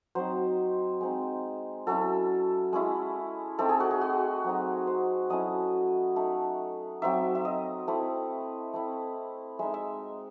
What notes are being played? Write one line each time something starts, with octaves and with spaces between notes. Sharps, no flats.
F#3 C4 D#4 C5
G#3 C4 D#4
F#3 C#4 E4 A4
G#3 C#4 E4
A3 C4 D#4 A4
G#4
F#4
G#4
F#4
F#3 C4 D#4
C5
F#3 A3 C#4 E4 D#5
A3 D#4
F#3 C4 D#4 E5
E5
D#5
A3 C4 E4
A3 C4 E4
G#3 D#4 E5
E5